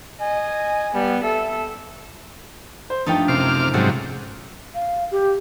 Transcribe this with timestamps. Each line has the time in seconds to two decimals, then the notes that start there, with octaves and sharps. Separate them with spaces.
0.21 D#5 G#5
0.94 G3 B3
1.23 A4 E5
2.90 C5
3.06 G2 F3 A3 D#4 G5
3.28 F#2 C3 D6 F6 C7
3.74 G#2 C3 F3 F#3 A3 C4
4.75 F5
5.11 G4